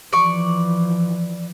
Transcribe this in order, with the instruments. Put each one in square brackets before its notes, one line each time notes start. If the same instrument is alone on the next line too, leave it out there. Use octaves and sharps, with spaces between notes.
[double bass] E3 F3 [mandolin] D5 C#6